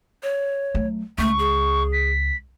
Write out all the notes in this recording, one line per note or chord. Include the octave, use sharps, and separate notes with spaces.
C#5
F#3 A3
C#2 A3 C#6
G#4
B6